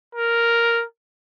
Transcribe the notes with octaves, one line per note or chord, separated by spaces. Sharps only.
A#4